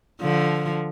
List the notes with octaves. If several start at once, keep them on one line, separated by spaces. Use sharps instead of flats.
D3 F3